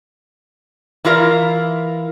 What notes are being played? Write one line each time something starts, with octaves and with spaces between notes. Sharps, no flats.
E3 E4 F4 A#4 E5